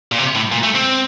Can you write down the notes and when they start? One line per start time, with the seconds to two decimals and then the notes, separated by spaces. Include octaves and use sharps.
0.12 A#2
0.18 C3
0.35 A2
0.52 A#2
0.63 A3
0.75 C4